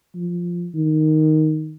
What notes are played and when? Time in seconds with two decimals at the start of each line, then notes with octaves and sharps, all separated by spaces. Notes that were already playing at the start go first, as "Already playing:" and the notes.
0.15 F3
0.75 D#3